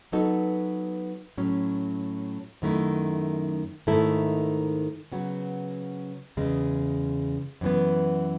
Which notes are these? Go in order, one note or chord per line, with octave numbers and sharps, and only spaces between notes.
F#3 B3 D#4 F#4 A4
A2 F#3 C#4
F#2 D#3 A3 E4
G#2 D#3 A3 E4 A4
C#3 F#3 B3 F#4
E2 C#3 G#3
F#2 E3 B3